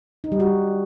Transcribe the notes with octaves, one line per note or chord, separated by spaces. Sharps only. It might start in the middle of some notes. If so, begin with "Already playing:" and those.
D#4
G3
F#4